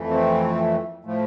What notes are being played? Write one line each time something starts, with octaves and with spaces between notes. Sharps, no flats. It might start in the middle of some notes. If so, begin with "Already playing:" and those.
Already playing: F2 E3 A3
C4
A2 F3 A3